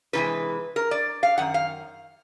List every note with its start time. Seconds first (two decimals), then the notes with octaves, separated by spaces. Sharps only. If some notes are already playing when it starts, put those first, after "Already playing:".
0.13 C3 E3 G#3 B4
0.76 A#4
0.91 D5
1.23 F5
1.38 F#2 D#3 F#5
1.54 F5